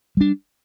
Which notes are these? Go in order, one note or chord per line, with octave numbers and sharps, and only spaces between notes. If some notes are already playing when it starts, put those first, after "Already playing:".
G3 D4